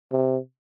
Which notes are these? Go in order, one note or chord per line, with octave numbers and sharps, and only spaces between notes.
C3